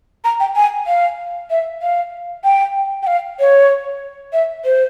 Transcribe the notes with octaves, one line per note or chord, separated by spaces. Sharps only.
A#5
G5
G#5
F5
E5
F5
G5
G5
F5
C#5
E5
C5